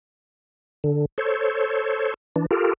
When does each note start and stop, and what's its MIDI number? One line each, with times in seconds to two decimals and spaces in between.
0.84 1.05 50
1.18 2.14 69
1.18 2.14 72
1.18 2.14 73
2.36 2.46 52
2.36 2.46 62
2.51 2.73 65
2.51 2.73 67
2.51 2.73 69
2.51 2.73 70